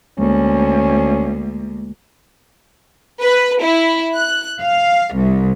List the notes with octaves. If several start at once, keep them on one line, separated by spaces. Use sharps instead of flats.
D2 G#3 A#3 C#4
B4
E4
F#6
F5
C2